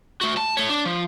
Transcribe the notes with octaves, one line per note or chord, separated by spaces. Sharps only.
A3 F#4
A5
A3 C#5
D4
F3